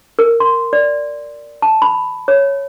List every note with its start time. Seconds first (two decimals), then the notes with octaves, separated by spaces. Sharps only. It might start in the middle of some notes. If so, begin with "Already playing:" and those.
0.19 A#4
0.40 C6
0.73 D5
1.62 A5
1.82 B5
2.28 C#5